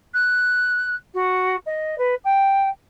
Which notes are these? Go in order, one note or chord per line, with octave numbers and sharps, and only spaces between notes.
F#6
F#4
D#5
B4
G5